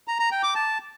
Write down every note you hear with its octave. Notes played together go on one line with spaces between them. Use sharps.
A#5
A#5
G5
D6
A5